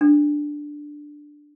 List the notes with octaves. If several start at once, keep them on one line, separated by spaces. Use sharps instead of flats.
D4